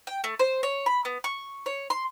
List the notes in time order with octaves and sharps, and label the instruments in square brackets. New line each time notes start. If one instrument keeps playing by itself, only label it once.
[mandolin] G5
A3
C5
C#5
B5
B3
C#6
C#5
C6